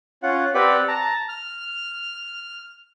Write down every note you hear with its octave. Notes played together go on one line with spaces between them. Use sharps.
C#4 F4 F#5
C4 G4 B4 D5 F#5 B5
A5 A#5
F6